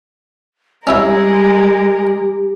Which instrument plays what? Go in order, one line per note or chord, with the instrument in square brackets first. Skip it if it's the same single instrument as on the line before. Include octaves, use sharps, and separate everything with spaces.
[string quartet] G3 G#3 A#4 [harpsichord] C#4 E4 C#5 [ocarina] G4